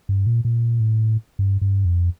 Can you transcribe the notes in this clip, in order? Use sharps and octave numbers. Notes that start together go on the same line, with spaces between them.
G2
A#2
A#2
A2
G2
G2
F2